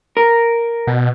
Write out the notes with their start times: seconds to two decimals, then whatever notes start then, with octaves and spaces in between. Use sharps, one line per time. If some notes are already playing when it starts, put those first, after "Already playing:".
0.17 A#4
0.87 B2